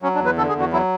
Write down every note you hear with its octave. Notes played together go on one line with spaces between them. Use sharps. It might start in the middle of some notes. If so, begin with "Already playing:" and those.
F#3 C#4
D4
E2
B4
D3 A4
G#4
E2
F#4
F#3 E4